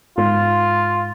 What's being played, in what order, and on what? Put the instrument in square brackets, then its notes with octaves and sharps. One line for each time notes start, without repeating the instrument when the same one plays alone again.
[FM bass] G#2 [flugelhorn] F4